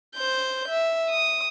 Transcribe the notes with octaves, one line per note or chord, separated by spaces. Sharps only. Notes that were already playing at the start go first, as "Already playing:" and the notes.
C5 G6
E5
D#6